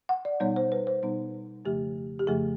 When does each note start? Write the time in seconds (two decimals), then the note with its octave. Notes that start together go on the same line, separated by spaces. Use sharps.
0.09 F#5
0.25 D5
0.40 B2 G3 B3 D#4 C#5
0.56 C5
0.72 B4
0.87 C5
1.03 B2 G3 B3 D#4
1.65 F2 C#3 F3 A3 G4
2.19 G4
2.27 F2 C#3 F3 A3 G#4